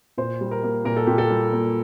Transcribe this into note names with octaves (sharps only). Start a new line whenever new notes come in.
A#2 C5
G3
A#4
A#3
A#2 A#4
A4
A#2 G4
A4
G3
A#3